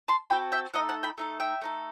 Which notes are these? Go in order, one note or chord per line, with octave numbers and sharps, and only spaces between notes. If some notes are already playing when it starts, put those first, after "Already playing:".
A5 C6
C4 F#4 A4 G5 B5
E5 G5
A3 D#4 A4 D#5 F#5
F#5 A5
G5 B5
A3 D#4 A4
E5 G5
A3 D#4 A4